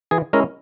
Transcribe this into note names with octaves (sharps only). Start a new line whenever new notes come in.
E3 G#4
G#3 C#4 E4 A#4